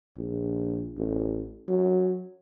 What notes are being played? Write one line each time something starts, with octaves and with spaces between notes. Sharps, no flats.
A#1
A1
F#3